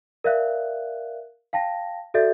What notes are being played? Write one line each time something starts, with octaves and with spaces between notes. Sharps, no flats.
A#4 D5 E5 F5 F#6
F5 G5 A5 A#6
F#4 A4 D5 E5 G6 A6